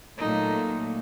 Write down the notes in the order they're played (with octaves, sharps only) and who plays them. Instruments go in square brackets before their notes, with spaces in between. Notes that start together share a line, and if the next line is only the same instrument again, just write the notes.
[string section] A#2 F#3 A3 [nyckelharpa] D#4